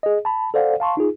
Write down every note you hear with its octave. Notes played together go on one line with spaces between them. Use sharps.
G#4 D#5
A5 B5
A4 C5 D5 F5 F#5
F5 A5 C6 C#6
D#4 F4 G#4